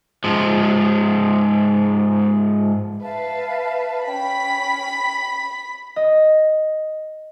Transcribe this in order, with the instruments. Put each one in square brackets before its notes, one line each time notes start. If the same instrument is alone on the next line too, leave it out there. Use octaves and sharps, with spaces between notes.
[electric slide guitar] G#2 F3
[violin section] B4 [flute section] E5 F5 A5
[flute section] C#4 G5 [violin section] B5 B6
[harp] D#5